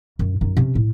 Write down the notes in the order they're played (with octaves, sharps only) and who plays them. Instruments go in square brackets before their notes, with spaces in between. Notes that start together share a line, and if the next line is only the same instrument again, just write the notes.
[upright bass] F#2
F#2 D#4
C3 C#4
A2